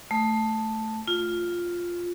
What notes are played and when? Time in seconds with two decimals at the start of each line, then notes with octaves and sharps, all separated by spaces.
0.11 A3
1.08 F4